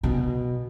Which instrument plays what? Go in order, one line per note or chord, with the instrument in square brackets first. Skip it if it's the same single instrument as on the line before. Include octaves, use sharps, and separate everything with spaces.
[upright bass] B2